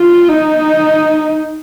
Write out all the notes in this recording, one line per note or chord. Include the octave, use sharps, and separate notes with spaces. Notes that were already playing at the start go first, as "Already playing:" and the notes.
Already playing: F4
D#4